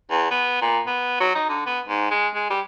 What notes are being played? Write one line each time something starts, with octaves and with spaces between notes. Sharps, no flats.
E2
B3
A#2
B3
F#3
D#4
D3
B3
G#2
G#3
G#3
G3